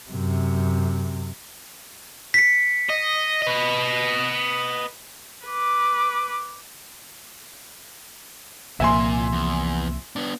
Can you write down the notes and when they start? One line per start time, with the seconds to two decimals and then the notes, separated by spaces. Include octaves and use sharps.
0.10 F#2 C3
2.34 B6 C#7
2.90 D#5
3.42 B4 D#5
5.46 B4 D6
8.80 C2 A#2 F3 A#3 E5 G#5 C6
9.32 E2
10.16 B3 D4